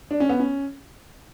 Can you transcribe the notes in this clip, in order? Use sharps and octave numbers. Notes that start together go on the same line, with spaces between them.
D4
C#4
B3
C#4